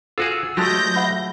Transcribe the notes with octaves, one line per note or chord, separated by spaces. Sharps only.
F4 F#4 G#4 A4 E6
F#3 G#3 A3 F4 G4 A5 G6 A#6
E5 F#5 B5